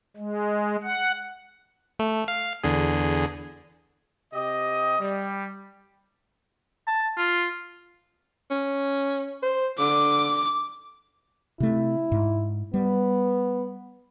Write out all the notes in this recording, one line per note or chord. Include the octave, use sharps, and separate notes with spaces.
G#3
F#5
A3
F5
E2 D3 G#4
C3 G4 D#5
G3
A5
F4
C#4
C5
D3 D6
C3 A3 E4
G#2
G3 B3